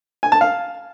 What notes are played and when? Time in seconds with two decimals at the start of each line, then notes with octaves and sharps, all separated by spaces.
0.23 G#5
0.32 A5
0.41 F5